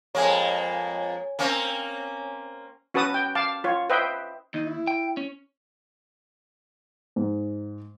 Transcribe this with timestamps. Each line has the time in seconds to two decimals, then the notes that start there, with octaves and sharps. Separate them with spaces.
0.15 F2 G#3 A#3 C#5 G#5
1.39 A#3 C4 C#4
2.94 C#4 F#4 B4 A5 D#6
3.14 G5
3.35 F5 A5 D6
3.64 F4 C#5
3.90 B4 C5 D#5 E5 G5
4.54 D#2 D#4
4.66 E4
4.87 G5
5.17 C#4
7.16 G#2